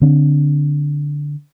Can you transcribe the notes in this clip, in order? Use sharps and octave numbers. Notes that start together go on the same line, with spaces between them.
D3 C4 D4